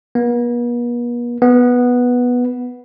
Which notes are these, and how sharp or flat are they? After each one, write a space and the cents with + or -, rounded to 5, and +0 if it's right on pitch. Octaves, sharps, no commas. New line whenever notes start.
B3 -45
B3 -5